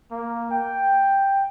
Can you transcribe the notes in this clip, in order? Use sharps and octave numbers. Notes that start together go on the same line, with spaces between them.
A#3
G5